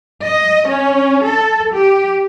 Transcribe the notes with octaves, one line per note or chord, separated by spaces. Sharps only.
D#5
C#4
A4
G4